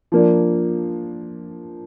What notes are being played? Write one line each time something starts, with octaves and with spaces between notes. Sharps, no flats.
F3 A#3 D4